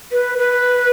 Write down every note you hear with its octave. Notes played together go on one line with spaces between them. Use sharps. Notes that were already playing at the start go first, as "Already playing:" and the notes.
B4
B4